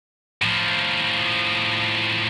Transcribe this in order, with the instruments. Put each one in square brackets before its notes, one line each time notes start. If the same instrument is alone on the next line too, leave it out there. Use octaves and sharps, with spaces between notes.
[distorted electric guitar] A2 F3